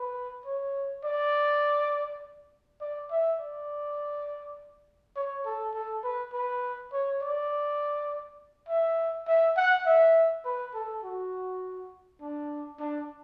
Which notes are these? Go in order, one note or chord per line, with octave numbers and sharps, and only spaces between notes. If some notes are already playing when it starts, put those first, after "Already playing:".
Already playing: B4
C#5
D5
D5
E5
D5
C#5
A4
A4
B4
B4
C#5
D5
E5
E5
F#5
E5
B4
A4
F#4
D4
D4